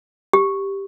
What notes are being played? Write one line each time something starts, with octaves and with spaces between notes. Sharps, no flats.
G4